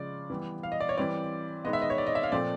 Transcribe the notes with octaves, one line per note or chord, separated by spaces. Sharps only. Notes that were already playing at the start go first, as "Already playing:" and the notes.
Already playing: C#3 F3 G#3 D5
E3 G3 B3
F5
D#5
D5
C#5
E3 G3 C4 D5
D#3 G#3 B3 D#5
E5
D#5
C#5
D5
D#5
E5
F5
A#2 F3 A3 C4 D5